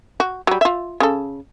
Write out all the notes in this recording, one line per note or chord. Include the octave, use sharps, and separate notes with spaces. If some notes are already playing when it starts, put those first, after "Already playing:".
F#4
F#3 G3
F4 E5
C#3 A4